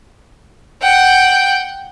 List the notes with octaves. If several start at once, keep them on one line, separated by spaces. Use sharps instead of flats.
F#5 G5